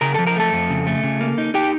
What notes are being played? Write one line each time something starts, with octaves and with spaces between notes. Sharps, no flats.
C#3 A#4 A#5
F3 A4 A5
A#4 A#5
A3 A4 A5
F2
C#3
A3
C#3
A#3
D#4
D#4 G4 G5